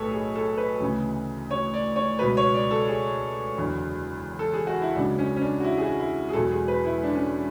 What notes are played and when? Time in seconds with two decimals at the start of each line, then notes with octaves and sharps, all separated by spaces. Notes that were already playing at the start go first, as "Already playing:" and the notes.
Already playing: B1 A2 F#3 A4 B4 C#5
0.11 G#4
0.36 A4
0.57 B4
0.80 D2 C#3 E3
1.51 C#5
1.74 D5
1.96 C#5
2.19 C#2 B2 F#3 B4
2.37 C#5
2.54 D5
2.71 A4
2.88 G#4
3.57 F#1 E2 D3 F#3
4.39 A4
4.54 G#4
4.67 F#4
4.82 E4
4.96 C#2 C#3 F#3 D4
5.18 C#4
5.36 C#4
5.41 D4
5.60 F#4
5.64 E4
5.77 G#4
5.83 F#4
6.00 E4
6.29 G#4
6.33 E1 E2 B2 F#3 A4
6.51 G#4
6.68 B4
6.85 E4
7.03 D4
7.15 C#4